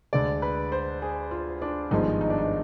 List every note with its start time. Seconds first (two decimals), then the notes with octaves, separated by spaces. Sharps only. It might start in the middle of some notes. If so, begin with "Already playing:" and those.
0.13 D2 D3 G#3 D5
0.42 B4
0.72 C5
1.02 G#4
1.31 F4
1.62 D4
1.91 G#1 G2 F3 G#3 B3 D#4
2.21 D#4
2.30 D4
2.38 D#4